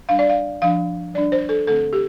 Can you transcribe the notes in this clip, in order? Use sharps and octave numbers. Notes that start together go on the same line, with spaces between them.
G3 D4 F5
D5
F5
F3 D4 F5
G3 D4 D5
C5
A4
D3 A3 C4 A4
G4